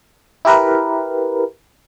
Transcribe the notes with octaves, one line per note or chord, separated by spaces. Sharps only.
E4 G4 A#4 B4